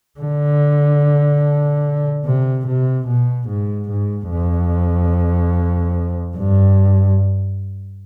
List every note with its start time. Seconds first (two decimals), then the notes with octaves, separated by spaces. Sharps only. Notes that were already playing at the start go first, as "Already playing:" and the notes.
0.19 D3
2.25 C3
2.66 C3
3.07 B2
3.47 G#2
3.89 G#2
4.30 F2
6.36 G2